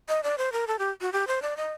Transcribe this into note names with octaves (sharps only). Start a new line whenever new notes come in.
D#5
D5
C5
A#4
A4
G4
F#4
G4
C5
D5
D#5